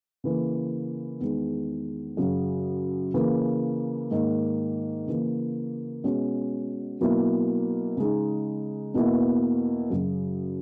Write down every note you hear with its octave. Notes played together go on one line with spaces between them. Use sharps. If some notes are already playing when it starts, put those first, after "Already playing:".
C#3 E3 A#3
E2 D#3 G#3
F#2 C#3 F#3
C#3 E3 A#3
G#2 D#3 A#3
C#3 E3 A#3
B2 G#3 C#4 F#4
B2 F#3 A#3 E4
C#3 G#3 D#4
E2 B2 A#3 E4
F#2 C#3 F#3